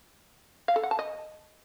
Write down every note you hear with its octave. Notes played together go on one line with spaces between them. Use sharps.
F5
A4
F#5
A5
D#5